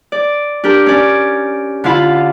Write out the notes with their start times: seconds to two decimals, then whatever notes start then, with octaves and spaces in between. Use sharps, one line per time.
0.12 D5
0.64 D4 G4 A#4
0.86 C#4 D5
1.84 D3 E4 F4 F5 B5